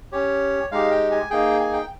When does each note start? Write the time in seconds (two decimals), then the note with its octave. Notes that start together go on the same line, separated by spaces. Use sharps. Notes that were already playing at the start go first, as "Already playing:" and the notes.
0.12 C#4 G4 C#5
0.71 G#3 D#4 G4 F5
0.91 G5
1.11 G#5
1.30 A#3 D#4 G#4 G5
1.61 G#5
1.73 G5